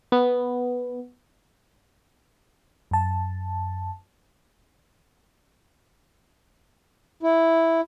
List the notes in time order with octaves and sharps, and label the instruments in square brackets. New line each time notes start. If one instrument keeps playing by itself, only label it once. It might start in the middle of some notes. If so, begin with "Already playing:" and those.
[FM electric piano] B3
F#2 A5
[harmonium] E4